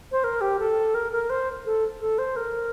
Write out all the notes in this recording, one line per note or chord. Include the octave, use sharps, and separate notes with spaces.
C5
A#4
G4
A4
A#4
A#4
C5
A4
A4
C5
A#4